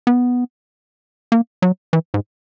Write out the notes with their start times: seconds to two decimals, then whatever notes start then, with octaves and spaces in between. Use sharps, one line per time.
0.07 B3
1.32 A#3
1.62 F#3
1.93 E3
2.14 G#2